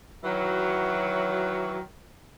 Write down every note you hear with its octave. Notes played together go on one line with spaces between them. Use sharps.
D#3 E3 F#3